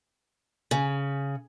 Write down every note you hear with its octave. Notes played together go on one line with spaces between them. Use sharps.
C#3